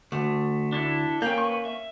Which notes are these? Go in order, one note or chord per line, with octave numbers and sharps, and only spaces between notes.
D2 A3
D4 E4 A4
A#3 C#4 G5 G6
B4 C#6
E5